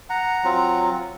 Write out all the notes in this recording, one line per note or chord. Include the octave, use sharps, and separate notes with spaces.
F#5 A#5
F#3 C4 F4